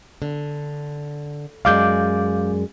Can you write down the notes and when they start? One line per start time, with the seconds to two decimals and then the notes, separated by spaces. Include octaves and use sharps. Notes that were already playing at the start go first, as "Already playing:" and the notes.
0.22 D3
1.65 F#2 G#3 D5 F5 D6 G6